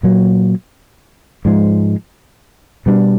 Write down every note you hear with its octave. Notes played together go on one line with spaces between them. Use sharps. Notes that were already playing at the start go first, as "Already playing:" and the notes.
A#2 F#3 A#3
G#2 F3 G#3
B2 G3 B3 D4